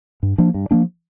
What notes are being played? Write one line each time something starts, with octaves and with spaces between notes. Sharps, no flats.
G2
F3 A#3 D4
G2
F3 A#3 D4